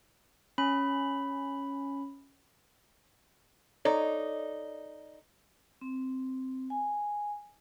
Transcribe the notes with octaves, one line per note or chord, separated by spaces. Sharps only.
C#4 B5
D#4 A4 C#5 D5
C4
G#5